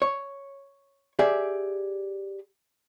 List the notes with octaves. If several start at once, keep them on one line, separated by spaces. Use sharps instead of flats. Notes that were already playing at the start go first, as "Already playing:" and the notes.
C#5
G4 G#4 D5 E5